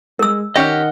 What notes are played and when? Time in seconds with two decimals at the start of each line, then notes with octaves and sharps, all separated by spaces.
0.19 G#3 A#4 E6
0.56 D#3 C#4 G4 D#5 F#5 F6